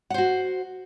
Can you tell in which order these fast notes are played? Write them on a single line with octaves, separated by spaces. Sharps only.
F#5 C5 F#4